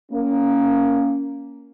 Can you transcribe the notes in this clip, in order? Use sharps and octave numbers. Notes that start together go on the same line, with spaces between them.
A#3 C#4